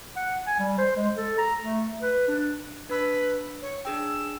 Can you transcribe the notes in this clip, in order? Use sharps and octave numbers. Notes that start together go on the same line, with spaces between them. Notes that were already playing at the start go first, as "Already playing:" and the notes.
F#5
G#5
G3
C5
G#3
A4
A#5
A3
B4
D4
D4 B4 E6
C#5
D4 G#4 G5 E6